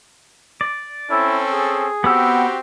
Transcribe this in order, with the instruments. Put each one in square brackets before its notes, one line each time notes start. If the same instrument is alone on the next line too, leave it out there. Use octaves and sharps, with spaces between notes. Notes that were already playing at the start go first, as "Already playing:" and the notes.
[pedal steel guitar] D5
[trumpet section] C4 C#4 A4 [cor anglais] E4
[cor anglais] G#4
[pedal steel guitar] B3 F#5 E6 [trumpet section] C4 F#4 G4